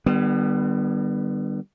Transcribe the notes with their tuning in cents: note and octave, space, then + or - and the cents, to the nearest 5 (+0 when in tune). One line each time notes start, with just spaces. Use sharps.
D3 +45 G3 +0 B3 +0